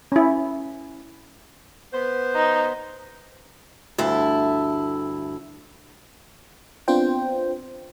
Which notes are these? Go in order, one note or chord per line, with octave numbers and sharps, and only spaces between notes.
C#4 E4
B3 C5
D#4
D2 G2 E4 A4
B3 C4 D4 F4 C5 G5